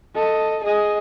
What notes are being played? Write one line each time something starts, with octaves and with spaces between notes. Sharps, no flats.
A4 D#5
G#4 D#5